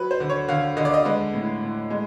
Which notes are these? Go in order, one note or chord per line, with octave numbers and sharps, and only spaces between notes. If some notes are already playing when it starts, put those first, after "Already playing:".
Already playing: F#3 B4
C5
D3
C#5
D3 F5
D3 D#5
D5
D#5
G#3 B4
A2
A2
G#3